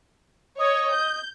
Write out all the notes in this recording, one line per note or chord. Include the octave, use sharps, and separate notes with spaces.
C#5 D#5
G6